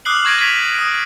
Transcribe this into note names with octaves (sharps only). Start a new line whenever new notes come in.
D6 D#6 F6 F#6 C7 F#7
C#6 G#6 A#6 D7 D#7
G#6 B6 F7
D#6 D7